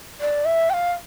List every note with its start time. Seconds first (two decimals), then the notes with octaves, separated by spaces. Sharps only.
0.21 D5
0.45 E5
0.70 G5
0.73 F5